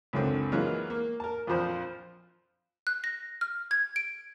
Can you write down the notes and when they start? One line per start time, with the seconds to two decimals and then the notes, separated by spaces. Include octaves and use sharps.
0.13 C#2 F#2 D3 C4
0.52 E3 F#3 G#3 A#3 F4
0.90 A#3
1.20 A#4 A5
1.47 A#1 F2 F3 C5
2.87 F#6
3.04 A#6
3.41 F6
3.71 G#6
3.96 D7